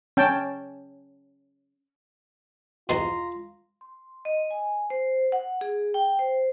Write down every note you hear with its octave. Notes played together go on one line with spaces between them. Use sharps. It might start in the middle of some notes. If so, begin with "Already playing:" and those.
C#4 G5 A5
E2 B2 F4 A#5 C6
C6
D#5
G#5
C5
F#5
G#4
G5
C5